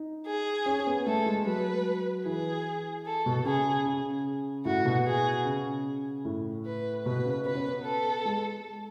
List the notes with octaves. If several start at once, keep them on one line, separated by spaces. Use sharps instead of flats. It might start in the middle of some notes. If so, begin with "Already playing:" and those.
Already playing: D#4
G#4
C#4
B3
A3 A4
G#3
F#3 B4
E3 G#4
A4
B2
C#3 G#4
C#3
A2 F#4
B2
G#4
C#3
A2
B4
B2 B4
C#3
B3 B4
C#4
B3
A4
G#3